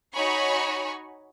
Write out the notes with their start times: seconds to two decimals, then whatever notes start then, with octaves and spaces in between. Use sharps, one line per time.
0.15 D#4 F#4 C#5 G#5 B5 C#6